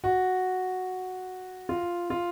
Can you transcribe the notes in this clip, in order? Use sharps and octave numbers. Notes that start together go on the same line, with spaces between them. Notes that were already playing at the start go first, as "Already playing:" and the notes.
F#4
F4
F4